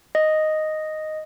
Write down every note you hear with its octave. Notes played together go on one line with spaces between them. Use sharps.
D#5